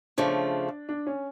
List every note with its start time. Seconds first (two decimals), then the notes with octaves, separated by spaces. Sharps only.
0.18 C#3 F3 A3 D4
0.89 D4
1.07 C#4